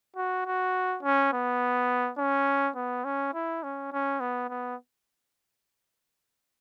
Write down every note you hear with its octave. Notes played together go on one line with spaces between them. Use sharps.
F#4
F#4
C#4
B3
C#4
B3
C#4
E4
C#4
C#4
B3
B3